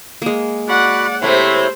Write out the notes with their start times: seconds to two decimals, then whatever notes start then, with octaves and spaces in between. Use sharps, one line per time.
0.22 G#3 A#3
0.69 F#4 D5 F#5 B5 F#6
1.22 C3 A3 E4 C5 C#5